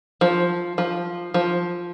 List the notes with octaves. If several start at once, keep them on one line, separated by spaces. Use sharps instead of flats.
F3
F3
F3